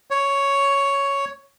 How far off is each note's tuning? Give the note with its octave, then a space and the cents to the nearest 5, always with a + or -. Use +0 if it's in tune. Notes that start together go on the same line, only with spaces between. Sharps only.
C#5 +5